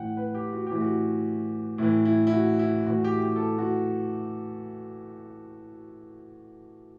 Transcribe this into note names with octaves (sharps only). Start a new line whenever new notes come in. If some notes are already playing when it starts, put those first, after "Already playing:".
Already playing: A2 E3 F#5 G5
B4
G4
F#4
A2 E3 G4
F#4
A2 E3 E4
E4
E4
F#4
E4
A2 E3 F#4
G4
G4
A4
G4
F#4